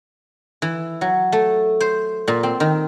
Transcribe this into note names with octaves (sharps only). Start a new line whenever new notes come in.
E3
F#3
A3
C5
A#2
C4
D#3